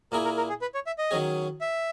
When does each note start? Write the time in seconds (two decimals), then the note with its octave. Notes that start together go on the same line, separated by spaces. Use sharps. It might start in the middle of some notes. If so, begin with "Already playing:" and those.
0.12 A#2 A#3 E4 G#4 A#4
0.25 A#4
0.37 A#4
0.49 G#4
0.61 B4
0.74 C#5
0.87 E5
0.98 D#5
1.11 D#3 F#3 C#4 G#4
1.61 E5